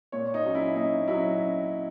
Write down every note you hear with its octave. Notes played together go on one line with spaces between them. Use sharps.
A#2 C#5
D#4
F#3 C#4
E4
A#2 D#4
F#3 C#4 E4